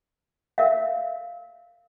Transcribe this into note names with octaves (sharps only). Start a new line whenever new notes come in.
A#4 E5 F5